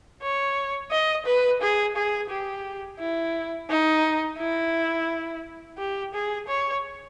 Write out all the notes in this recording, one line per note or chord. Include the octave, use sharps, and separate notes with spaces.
C#5
D#5
B4
G#4
G#4
G4
E4
D#4
E4
G4
G#4
C#5